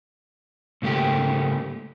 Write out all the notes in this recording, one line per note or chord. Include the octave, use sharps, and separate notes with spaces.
G#2 C#3 A3 A#3 G4